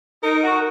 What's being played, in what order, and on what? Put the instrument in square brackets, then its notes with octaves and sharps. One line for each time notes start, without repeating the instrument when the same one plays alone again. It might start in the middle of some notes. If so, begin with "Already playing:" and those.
[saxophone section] D#4 [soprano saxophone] A#4
[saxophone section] F#4